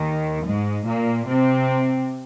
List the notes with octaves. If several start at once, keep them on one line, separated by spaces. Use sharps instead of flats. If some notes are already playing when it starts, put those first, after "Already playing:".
Already playing: D#2 D#3
G#2 G#3
A#2 A#3
C3 C4